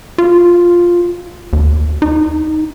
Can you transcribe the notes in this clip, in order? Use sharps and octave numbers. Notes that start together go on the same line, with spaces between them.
F4
D#2
D#4